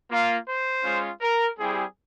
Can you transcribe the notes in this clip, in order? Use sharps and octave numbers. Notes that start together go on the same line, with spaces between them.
A#3 F4
C5
G#3 C#4 F4
A#4
G3 C4 E4 G4 G#4